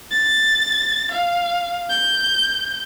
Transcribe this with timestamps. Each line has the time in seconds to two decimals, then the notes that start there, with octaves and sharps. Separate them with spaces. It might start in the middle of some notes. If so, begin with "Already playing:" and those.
0.11 A6
1.12 F5
1.90 G6